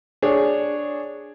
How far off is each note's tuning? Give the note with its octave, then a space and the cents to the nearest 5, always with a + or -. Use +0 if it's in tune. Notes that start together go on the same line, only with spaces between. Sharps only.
D4 +0 G#4 +0 C#5 +0